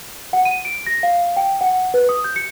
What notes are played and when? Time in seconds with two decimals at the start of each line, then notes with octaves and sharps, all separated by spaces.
0.33 F#5
0.45 D#7
0.65 D7
0.86 A#6
1.03 F5
1.37 G5
1.61 F#5
1.94 B4
2.09 D#6
2.24 G6
2.36 C#7